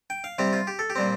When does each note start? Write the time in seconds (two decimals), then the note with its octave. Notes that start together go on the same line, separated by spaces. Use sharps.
0.10 G5
0.24 F5
0.38 C3 G3 C4 G4
0.53 F4
0.67 G4
0.79 A4
0.90 G4
0.96 A#2 G3 C4